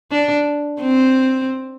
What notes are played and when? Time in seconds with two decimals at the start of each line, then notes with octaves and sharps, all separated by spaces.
0.11 D4
0.81 C4